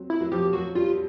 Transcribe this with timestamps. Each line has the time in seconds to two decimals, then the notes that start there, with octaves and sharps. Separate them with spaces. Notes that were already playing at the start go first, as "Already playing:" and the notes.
Already playing: F#3 C4
0.10 E4
0.21 F#3
0.32 F3 G4
0.53 F#3 F#4
0.75 G3 F4